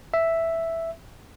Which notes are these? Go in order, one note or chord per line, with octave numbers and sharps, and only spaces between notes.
E5